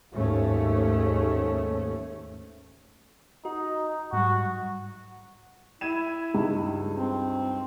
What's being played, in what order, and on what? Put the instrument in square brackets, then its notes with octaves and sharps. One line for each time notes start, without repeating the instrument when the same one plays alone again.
[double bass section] D#2 G#2 A3 C#4
[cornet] D#4 [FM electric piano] F#4
[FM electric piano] G#2 F#3 G3 [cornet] F#4
[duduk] E4 [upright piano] G#6 D#7 E7
[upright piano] C#2 G2 D#4
[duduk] C4